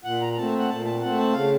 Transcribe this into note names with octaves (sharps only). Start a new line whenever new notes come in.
A#2 F#5
A#5
A#5
A3 C4 A5
F#5
A#2 A5
A5
A3 C4 F#5
A5
C#3 F5